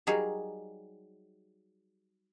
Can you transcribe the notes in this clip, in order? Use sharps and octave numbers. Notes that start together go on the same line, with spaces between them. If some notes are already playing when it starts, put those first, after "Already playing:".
F#3 G3 D#4 G#4 A#4